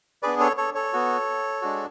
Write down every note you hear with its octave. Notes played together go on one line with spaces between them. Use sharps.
B3 D4 G#4 B4 D5
A4 C#5
A4 C#5
A4 C#5
B3 F#4
G#3 D4 F#4